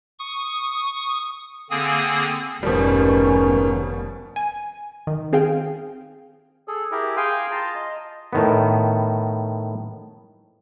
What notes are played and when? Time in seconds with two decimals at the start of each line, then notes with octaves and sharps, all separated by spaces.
0.19 C#6 D#6
1.71 D3 A#3 C4 G#4 G#5 D#6
2.63 F1 G#2 B2 D#3 F3 G3 B3 C#4
4.36 G#5
5.07 D#3
5.33 C4 G#4 F5 G5
6.68 G#4 A4
6.92 E4 G4 G#4 A#4
7.17 G#4 F5 G5 G#5 C6
7.51 F4 A5 A#5 C6
7.75 D#5
8.33 A2 D#3 B3